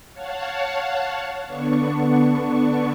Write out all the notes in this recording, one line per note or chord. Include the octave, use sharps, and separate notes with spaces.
C#5 F5 F#5 A5
D3 B3 D4 C#6